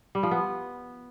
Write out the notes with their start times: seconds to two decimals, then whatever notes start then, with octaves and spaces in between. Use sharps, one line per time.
0.15 G3
0.23 F3
0.31 B3